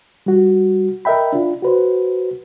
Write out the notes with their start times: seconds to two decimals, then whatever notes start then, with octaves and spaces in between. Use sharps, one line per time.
0.26 G3 F#4
1.05 A#4 D#5 E5 G5 B5
1.33 D4 F4
1.62 F#4 B4 C5